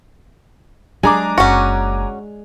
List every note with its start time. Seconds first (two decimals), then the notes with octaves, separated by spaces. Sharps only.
1.03 F#3 G#3 D4 G#4 G#5 A#5 D6
1.38 F#1 C#4 F#4